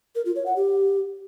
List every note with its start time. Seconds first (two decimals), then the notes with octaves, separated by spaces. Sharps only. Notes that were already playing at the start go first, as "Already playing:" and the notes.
0.15 A#4
0.26 F4
0.36 C#5
0.46 F#5
0.56 G4